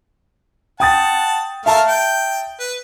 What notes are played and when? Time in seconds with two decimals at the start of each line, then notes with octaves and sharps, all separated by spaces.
0.80 F#5 G5 A5 D#6 A6
1.66 A3 A#4 E5 F5 A5
1.87 G5
2.60 B4